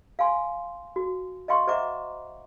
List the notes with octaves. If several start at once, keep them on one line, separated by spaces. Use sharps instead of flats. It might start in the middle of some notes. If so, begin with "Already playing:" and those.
F5 G5 G#5 C6
F#4
D#5 F5 G5 C6 C#6
C5 D#5 E5 F#5 A#5 D6